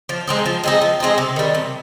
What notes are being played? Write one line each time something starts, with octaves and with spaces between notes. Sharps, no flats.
F3
G#3 C4 D#4
F3
G#3 C4 D#4
F3
G#3 C4 D#4
C3
D#3 G3
C3